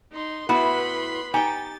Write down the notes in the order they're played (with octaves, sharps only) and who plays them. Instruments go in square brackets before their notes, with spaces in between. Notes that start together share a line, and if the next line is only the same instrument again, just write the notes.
[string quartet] D#4 C6
[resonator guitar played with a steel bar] A2 E4 F#4 [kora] B3 [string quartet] B4 B5 C6
[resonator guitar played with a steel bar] D#4 G#5 [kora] G4 G5 [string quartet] A6